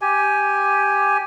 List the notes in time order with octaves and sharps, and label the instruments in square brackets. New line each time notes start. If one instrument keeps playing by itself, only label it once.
[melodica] G4 G#5